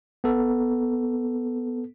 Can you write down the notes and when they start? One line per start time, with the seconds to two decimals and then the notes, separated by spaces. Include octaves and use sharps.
0.24 B3 A4